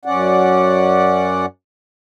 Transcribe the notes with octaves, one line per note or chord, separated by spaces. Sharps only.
F#2 C#4 D5 F#5